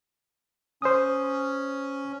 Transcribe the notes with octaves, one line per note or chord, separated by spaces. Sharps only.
C#4 C5 D#6